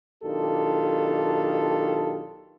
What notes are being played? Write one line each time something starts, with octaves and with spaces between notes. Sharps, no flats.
B1 D#3 D4 F4 G4 A4